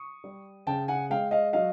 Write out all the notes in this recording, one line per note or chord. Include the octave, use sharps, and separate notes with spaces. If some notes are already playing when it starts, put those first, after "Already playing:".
Already playing: C#6 D#6
G3
C#3 G5 A5
F#5 G#5
G#3 F5 G5
D#5 F5
F#3 D#5 F5